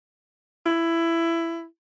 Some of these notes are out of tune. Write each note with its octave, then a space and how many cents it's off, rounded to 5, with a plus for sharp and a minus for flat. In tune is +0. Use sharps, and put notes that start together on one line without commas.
E4 +15